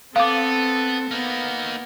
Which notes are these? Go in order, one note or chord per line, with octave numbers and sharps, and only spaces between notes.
B3 C4 A4 F5 D6
A#3 B3 D#4